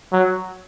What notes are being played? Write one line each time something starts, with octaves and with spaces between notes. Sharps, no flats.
F#3